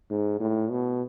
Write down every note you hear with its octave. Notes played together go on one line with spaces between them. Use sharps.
G#2
A2
B2